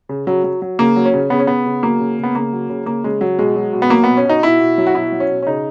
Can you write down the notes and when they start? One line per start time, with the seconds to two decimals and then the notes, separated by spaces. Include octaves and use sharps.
0.09 C#3
0.27 C#3 F#3
0.44 F#3
0.62 F#3
0.79 C#3 A#3
0.96 F#3
1.05 C#4
1.14 C#3
1.30 C#3 B3
1.40 C#4
1.47 C#3 B3
1.66 C#3
1.83 F#3 A#3
2.00 C#3
2.18 C#3
2.23 B3
2.35 C#3 A#3
2.53 F#3
2.70 C#3
2.86 C#3 A#3
3.04 C#3 G#3
3.21 F#3
3.39 B2 G#3
3.56 F#3
3.73 B2
3.82 B3
3.90 F#3 A#3
4.04 B2 B3
4.17 C#4
4.25 B2 D#4
4.43 B2 E4
4.60 B2
4.78 F#3
4.87 F#4
4.94 B2 E4
5.12 F#3
5.20 C#4
5.29 B2
5.42 C#4
5.47 C#3 D#4